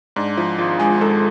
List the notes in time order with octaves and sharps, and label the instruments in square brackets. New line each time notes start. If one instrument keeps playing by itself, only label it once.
[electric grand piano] G#2 [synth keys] D4
[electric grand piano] F3 [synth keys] E4
[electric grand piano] G#1 [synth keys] F4
[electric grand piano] G#3 [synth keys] G#4
[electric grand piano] G#2 [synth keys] A4